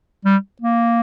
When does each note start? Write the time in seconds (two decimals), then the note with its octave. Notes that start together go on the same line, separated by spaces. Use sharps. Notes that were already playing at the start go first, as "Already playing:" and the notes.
0.25 G3
0.61 A#3